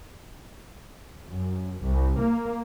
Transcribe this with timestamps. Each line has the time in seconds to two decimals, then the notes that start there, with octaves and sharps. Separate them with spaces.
1.28 F#2
1.82 C2
2.18 A#3